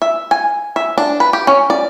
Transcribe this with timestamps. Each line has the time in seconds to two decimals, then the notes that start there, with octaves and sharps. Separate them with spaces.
0.02 E5
0.31 G#5
0.76 E5
0.98 D4
1.20 B4
1.33 G4
1.47 C#4
1.70 D5